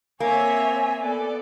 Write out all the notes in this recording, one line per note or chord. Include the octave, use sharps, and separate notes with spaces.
A#3 C4 C#5 E5 G#5
B3 A4 D5